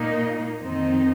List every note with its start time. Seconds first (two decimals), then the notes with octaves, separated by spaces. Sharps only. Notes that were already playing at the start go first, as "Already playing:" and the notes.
Already playing: A#2 A#3 D#4
0.59 F2 D#3 C4 D#4